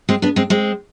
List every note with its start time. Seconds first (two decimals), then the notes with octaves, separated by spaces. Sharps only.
0.09 G#3 C4
0.22 B3 D4
0.36 G#3 C4
0.50 G#3 C4